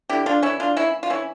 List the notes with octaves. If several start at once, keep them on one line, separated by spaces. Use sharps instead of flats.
D3 E4 G4
D4 F4
E3 C#4 E4
D4 F4
A#3 C#4 E4
F4
E3 C#4 E4